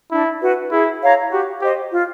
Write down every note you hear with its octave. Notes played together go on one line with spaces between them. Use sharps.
D4 E4
F#4 B4
E4 G#4
C#5 F5 A#5
F#4 G4
G4 C5 D#5
F4